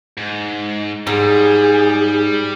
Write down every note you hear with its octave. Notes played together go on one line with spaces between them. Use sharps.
G#2
G#2 G3 G#4